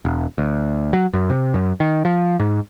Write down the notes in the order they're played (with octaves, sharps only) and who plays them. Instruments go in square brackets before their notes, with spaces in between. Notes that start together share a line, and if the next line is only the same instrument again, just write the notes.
[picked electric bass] E1
D2
F#3
F#2
C3
F#2
D#3
F3
G#2